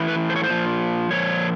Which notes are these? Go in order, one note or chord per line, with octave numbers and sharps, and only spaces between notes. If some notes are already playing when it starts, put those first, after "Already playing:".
Already playing: A2 E3
B4
C5
C#5
C5
A#2 F3
A#2 F3 C#5